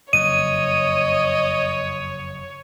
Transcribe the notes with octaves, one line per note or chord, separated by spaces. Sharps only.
F#1 F2 C#5 D#5 D#7